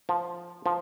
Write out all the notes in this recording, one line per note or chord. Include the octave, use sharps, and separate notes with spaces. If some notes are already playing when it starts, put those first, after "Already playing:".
F3
F3